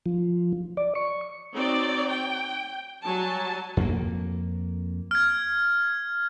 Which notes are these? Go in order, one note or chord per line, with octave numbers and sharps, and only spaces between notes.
F3
D5
C#6
C4 D#4 F#4 C#5 D5
G5
F#3 G3 G#5 A5
F2 A#3
F6 G#6